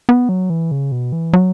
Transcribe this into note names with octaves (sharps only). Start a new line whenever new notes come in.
B3
F#3
E3
C#3
B2
E3
F#3